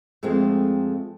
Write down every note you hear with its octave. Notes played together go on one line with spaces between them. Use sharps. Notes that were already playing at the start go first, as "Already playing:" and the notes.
F2 G#3 A3 C4